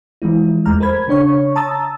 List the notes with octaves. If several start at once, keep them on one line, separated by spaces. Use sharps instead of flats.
E3 F3 G#3 E4
E2 G#3 A3 A#5 F6
A4 A#4 C5 B5 G#6
C#3 D4 C#5 C#6
A5 A#5 D#6 E6 A6